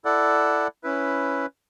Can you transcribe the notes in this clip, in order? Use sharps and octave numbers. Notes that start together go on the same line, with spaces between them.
E4 A4 D5 F#5
C#4 E4 B4